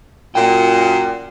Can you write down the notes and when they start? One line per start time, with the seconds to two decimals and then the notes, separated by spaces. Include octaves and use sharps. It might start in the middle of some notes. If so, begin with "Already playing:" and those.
0.35 F#2 A#2 F#5 G5